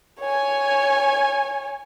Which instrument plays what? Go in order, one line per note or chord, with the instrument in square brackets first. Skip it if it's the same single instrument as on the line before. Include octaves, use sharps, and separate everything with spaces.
[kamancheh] C#5 G#5